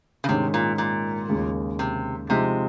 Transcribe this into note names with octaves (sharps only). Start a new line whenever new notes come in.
C#3
G#2 C3 D#3 G#3 C#4
A#2
A#2
D#2 C#3 G#3
C3
C3 F3 G#3 C4 D#4